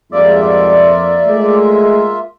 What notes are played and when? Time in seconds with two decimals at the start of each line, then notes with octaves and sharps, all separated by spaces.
0.12 F2 G#2 G3 G#3 A#3 F4 D5 E5
1.27 G#3 A3